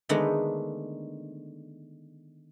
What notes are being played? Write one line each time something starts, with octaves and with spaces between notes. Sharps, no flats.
D3 D#3 G#3 A3 B3 D#4